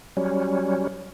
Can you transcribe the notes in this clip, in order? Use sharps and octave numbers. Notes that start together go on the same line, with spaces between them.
F#3 G3 C#4